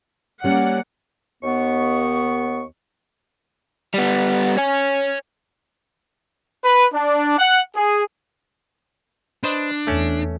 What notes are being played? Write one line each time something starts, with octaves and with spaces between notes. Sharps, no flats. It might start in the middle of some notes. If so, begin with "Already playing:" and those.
G3 A#3 C#4 D5 F#5
D#2 B3 C#6
G3 B3
C#5 G#5
B4
D4
F#5
G#4
D4 B4 C5 D#5
E2 A3 C#4